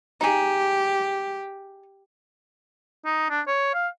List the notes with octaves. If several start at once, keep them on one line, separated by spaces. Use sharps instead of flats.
D#4 G4 G#4
D#4
D4
C#5
F5